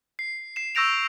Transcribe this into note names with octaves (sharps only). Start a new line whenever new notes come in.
C7
C7 E7
C#6 E6 G6 A#6 D7 F7